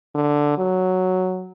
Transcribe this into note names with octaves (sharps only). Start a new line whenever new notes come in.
D3
F#3